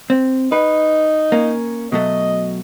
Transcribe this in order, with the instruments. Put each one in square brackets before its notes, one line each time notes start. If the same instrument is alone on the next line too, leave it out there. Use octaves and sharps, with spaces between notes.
[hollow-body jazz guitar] C4
[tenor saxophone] D#4 [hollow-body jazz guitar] B4
[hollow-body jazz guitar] A#3 C#4
[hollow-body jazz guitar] B2 F#3 A3 [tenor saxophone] D#5